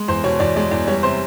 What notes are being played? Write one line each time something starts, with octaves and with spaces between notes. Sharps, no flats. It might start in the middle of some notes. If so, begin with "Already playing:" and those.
Already playing: G#3
E2 C5
B2 C#5
E2 D5
G#3 D5
E2 D5
G3 C#5
C3 C5